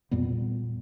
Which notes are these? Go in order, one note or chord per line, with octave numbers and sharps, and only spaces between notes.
E2 A#2 G3 B3